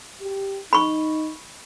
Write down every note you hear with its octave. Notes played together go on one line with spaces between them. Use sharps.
G4
D#4 B5 C#6